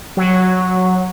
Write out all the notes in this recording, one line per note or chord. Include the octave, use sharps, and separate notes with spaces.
F#3